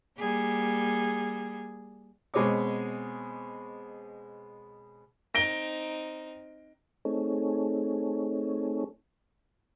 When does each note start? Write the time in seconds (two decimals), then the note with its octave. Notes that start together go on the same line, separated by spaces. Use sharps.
0.18 G3 A#3 G#4
2.34 B2 G#3 C4 C#5 D6
5.35 C4 D#4 A#6 D7 G7
7.05 A3 C4 D#4 G#4 A4 C#5